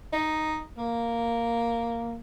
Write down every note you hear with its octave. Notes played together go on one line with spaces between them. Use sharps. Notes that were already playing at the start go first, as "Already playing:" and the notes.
D#4
A#3